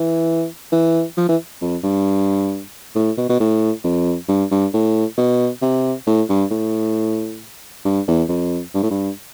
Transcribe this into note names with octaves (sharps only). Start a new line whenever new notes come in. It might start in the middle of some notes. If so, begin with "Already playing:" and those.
Already playing: E3
E3
F3
E3
F2
G2
A2
B2
B2
A2
F2
G2
G2
A2
B2
C3
A2
G2
A2
G2
E2
F2
G2
A2
G2